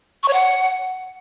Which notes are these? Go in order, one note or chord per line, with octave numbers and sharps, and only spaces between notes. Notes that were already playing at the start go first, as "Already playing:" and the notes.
C#6
C#5
F#5